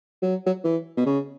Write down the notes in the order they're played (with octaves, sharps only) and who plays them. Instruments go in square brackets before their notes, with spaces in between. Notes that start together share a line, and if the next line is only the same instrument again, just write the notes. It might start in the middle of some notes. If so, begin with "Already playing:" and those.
[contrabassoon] F#3
F#3
E3
B2
C#3